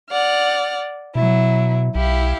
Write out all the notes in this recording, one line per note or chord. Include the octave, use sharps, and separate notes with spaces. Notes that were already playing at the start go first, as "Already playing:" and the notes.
D5 F#5 F6
B2 F#3 E4
B1 E4 G4 F5